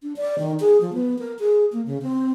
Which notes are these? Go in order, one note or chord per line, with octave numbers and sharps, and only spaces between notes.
D4
D5
D#3
G#4
F3
B3
A#4
G#4
A#3
C#3
C4